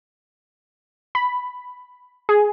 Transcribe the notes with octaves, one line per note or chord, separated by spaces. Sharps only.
B5
G#4